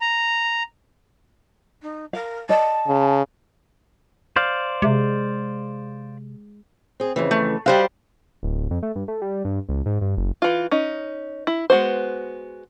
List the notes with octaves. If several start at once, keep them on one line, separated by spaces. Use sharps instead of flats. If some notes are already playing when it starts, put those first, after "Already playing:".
A#5
D#4
A#4 F5
D5 D#5 A5
C#3
C5 D5 F5
C3 G#3
C4 G#4
F2 C#3 E3
A3
G3 F#4 G4 C5 D#5 F5
D1
F2
A3
G2
A3
G3
G2
C#2
G#2
G2
F#1
E3 F4
C#4 D#4
E4
G#3 B3 F#4 C5